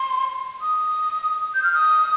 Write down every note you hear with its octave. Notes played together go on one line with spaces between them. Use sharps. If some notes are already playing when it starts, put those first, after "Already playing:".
Already playing: C6
D#6
G6
F6
D#6